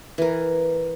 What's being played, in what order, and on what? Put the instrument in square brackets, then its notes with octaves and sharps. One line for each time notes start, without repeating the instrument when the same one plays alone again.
[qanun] E3 A#4